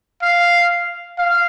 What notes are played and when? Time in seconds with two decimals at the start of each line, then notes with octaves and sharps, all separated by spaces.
0.22 F5
1.18 F5